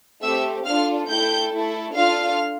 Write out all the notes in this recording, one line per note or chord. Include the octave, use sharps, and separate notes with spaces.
A3 C4 G4 E5 E6
D4 F4 A4 F5 F6
A3 E4 A4 G5 G6
A3 E4 A4
D4 F4 A4 F5 F6